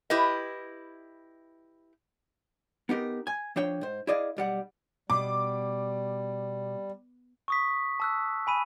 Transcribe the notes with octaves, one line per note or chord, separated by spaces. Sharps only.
E4 G4 B4 D#5
B3 D#4 G4 A#4
G#5
F3 D4 C#5 G5
G#2 C5
E4 G#4 D5 D#5 F5
B1 G3 F#5
B2 G3 D6
C#6 D#6 B6
A5 E6 F#6
G#5 B5 D#7